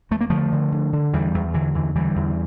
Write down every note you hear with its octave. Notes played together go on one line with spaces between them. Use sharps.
E2 A3
A#3
D3 F3 A3
D3
D3
D3
E2 E3 G3
E2
D3 E3
E2 E3
D3 E3 G3
E2